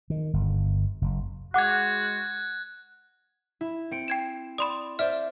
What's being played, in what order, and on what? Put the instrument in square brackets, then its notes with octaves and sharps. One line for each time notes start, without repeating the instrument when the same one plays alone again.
[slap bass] D#3
G1
F#1
[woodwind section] G#3 F#4 [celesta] F#5 D6 [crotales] F#6 G#6
[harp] E4
C4 C#7 D7
[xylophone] G5 G#6 E7
[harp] D5 [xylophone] B5 C6 D#6
[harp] C5 D5 E5 [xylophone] F6